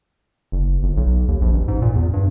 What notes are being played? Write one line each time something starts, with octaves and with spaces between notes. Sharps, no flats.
F#1
G1
B1
D#2
A#1
A1
G#2
A#2
E2
G2